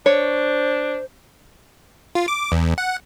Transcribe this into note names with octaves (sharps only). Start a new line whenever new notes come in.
D4 C5 C#5
F4
D6
E2
F#5